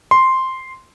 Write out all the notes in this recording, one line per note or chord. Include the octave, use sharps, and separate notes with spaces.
C6